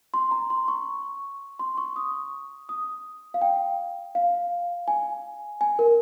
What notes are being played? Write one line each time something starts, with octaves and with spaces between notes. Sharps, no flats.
C6
A#5
C6
C#6
C6
C#6
D#6
D#6
F5
G5
F5
G#5
G#5
A#4